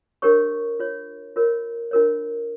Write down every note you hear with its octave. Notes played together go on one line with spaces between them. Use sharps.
D4 G4 A#4 C#5 C#6
F4 C#5
F4 A#4 C#5
D4 F4 A#4 C#5